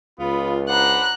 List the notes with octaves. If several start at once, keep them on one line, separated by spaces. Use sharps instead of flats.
C#2 B3 F4 B5
D4 C5 F#5 A#5 B5 F#6